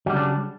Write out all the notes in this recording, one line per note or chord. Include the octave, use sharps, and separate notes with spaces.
C#3 F#3 G3 D4